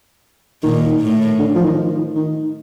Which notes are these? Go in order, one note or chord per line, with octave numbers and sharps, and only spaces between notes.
A#2 D#3
A2
D3
F3
D#3
D#3
D#3